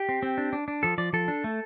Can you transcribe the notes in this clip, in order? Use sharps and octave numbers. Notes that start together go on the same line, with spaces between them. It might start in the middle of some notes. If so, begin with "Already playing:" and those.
Already playing: G4
C4
C4
D4
D4
D4
F3 A4
F3 D5
F3 A4
D4
A3